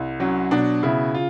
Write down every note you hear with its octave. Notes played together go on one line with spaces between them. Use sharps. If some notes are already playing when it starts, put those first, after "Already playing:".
Already playing: C2
F#3 C#4
B2 D4
C#3 E4
F4